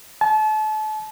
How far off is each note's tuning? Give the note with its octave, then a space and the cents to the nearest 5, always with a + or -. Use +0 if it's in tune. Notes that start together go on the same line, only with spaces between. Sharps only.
A5 -35